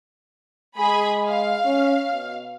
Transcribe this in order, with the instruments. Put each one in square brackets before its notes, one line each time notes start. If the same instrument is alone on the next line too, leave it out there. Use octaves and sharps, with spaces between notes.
[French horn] G#3 [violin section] G#4 B5
[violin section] F5
[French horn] C#4
B2